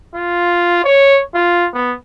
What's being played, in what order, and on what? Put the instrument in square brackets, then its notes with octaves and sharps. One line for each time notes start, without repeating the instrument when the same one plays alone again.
[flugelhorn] F4
C#5
F4
B3